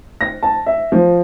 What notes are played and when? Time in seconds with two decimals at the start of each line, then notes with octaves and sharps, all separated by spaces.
0.21 A#6
0.43 A5
0.66 E5
0.92 F3